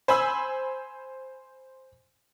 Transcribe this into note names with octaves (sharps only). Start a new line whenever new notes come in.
C5 G#5 B5 E6